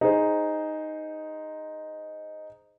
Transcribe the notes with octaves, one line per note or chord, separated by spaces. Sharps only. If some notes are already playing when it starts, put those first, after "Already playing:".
D#4 G#4 C5